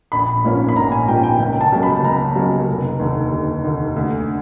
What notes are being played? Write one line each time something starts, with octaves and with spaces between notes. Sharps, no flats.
A#1 B5
G#2 F3 A#3 C#4
B5
A#1 A#5
G#5
G#2 F3 A#3 C#4 G5
G5
C#2 G5
A5
C#3 F#3 A#3
B5
C#2 A#5
C#3 F#3 A#3
F1
D#2 D3
F1
D#2 D3
D2